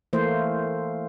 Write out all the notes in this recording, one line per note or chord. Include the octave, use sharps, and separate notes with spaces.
E3 A3 A#3 C5